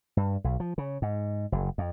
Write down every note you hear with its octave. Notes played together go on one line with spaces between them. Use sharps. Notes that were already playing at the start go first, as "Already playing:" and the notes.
G2
B1
F3
C#3
G#2
F#1
F2